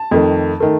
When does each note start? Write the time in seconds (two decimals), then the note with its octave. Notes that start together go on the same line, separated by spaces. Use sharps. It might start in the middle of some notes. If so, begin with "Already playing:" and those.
Already playing: A5
0.11 F2 D#3 A3
0.60 D#3 A3